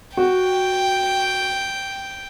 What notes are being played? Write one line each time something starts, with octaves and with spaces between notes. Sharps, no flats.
F#4 G5